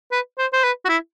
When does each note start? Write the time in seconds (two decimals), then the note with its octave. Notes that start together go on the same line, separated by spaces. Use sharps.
0.12 B4
0.38 C5
0.53 C5
0.64 B4
0.85 F#4
0.89 E4